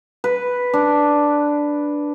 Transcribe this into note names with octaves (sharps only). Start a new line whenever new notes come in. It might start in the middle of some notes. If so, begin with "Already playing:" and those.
B4
D4